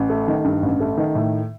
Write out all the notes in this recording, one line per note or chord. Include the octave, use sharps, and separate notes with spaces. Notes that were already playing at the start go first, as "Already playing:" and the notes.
Already playing: A1
A3
D#3
G2
A1
A3
D#3
A2